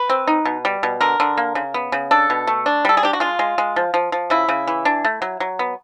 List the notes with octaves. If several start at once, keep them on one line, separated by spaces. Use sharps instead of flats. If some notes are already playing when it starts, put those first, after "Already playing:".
Already playing: B4
C4
D#4
B2
G3
B2
D3 A#4
D3
A#3
C#3
B3
C#3
D4 A4
B2
A3
D4
G3 A4
G#4
D4 G4
F#4
G#3 F4
G#3
G#3
F3
F3
F3
C#3 E4
C#3
E3
D4
A3
F#3
F#3
B3